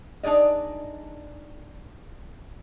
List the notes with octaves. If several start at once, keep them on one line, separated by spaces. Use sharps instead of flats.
D4 D#4 G#4 D5 D#5